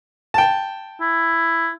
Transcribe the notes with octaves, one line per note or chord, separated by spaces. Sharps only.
G5 A5
E4